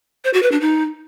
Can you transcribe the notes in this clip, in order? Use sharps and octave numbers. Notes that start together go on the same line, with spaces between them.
C5
F#4
B4
D4
D#4